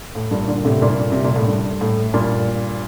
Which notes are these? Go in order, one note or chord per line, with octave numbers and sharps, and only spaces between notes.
A2
G2 A#2
A#2 D3
A2 C3
G2 A#2
C3
A#2
A2
G2
A2
G2 A#2